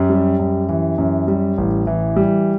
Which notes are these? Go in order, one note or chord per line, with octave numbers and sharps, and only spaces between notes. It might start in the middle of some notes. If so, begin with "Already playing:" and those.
Already playing: F#2 G4
G3
F#2
E3
F#2
G3
A1
E3
G3